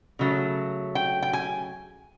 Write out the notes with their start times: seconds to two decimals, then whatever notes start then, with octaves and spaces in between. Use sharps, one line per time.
0.19 C#3 F#3 A3
0.95 G5
1.22 G5
1.33 G#5